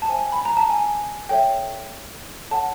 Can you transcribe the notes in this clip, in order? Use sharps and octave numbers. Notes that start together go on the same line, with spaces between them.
A5
C5 E5 G5 G#5
B5
A#5
A5
G#5
A4 C#5 E5 G5
A4 C#5 F#5 A5